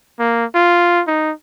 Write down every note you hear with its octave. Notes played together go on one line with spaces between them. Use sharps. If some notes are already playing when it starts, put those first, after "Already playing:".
A#3
F4
D#4